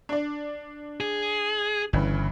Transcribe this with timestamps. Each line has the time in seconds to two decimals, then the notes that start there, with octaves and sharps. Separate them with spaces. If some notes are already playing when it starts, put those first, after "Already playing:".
0.09 D4 D5
1.00 G#4
1.93 G1 G2 C#3 E3